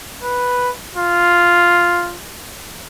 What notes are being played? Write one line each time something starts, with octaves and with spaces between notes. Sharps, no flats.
B4
F4